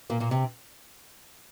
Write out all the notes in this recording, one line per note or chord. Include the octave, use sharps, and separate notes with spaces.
A#2 A#3
A#2 A#3
C3 C4